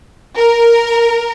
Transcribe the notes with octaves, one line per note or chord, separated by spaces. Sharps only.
A#4